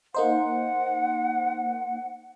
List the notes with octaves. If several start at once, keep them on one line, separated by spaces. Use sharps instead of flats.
A#3 D#4 C5 F#5